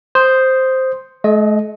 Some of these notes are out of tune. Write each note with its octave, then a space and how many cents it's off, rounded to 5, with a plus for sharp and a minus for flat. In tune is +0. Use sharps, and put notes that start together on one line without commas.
C5 +0 D#6 +0
A3 -45 D#5 +0